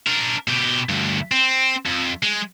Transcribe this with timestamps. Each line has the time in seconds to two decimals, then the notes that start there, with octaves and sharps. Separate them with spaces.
0.07 D4 A#4
0.48 B2 G4
0.89 D2 G2
1.32 C4
1.86 F2
2.23 G#3